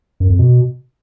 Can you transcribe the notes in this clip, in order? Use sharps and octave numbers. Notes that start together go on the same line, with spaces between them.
F#2
F2
B2